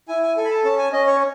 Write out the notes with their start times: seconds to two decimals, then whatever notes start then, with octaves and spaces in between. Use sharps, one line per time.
0.08 E4 G#5
0.23 G#5
0.37 A4 G#5
0.45 B5
0.51 A5
0.64 C#4 A5
0.79 G#5
0.92 C#4 D#5
1.07 C#5